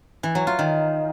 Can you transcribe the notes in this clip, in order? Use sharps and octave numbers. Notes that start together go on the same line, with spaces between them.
E3
F#3
F4
D#3